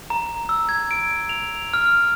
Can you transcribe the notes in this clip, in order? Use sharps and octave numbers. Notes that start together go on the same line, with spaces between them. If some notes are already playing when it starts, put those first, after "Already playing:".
A#5
E6
G#6
D7
F7
F6